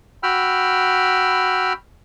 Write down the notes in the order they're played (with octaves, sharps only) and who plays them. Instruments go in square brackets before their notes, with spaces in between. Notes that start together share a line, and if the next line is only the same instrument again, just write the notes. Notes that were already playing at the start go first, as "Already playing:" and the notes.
[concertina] F#4 G5 B5 E6 F6